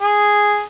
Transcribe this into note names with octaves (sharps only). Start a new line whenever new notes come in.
G#4